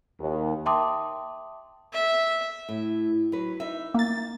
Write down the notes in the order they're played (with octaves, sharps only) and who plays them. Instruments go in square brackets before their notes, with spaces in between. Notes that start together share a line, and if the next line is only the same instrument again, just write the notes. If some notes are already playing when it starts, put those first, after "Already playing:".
[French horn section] D#2
[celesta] E5 G5 A5 C6 D6 D#6
[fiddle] E5
[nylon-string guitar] A2
F#3 B4
D#4 E5
[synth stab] A#3 A6